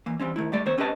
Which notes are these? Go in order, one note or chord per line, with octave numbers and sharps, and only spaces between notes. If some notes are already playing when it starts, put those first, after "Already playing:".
E3 A#3
E3 G3 C4 C#4
D#3 A3 E4
G3 A3 D5
D#3 B3 C4 C5 C#5
C4 C#4 G4 B4 D#5 A5